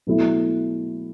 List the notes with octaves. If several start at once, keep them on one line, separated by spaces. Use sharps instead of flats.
B2 F#3 A3 E4